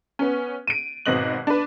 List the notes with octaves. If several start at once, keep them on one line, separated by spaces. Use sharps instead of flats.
B3 C#4
D7 D#7
G#1 B2 C4 D#5 F#6 F#7
D4 B4